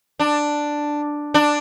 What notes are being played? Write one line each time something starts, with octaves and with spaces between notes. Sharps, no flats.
D4
D4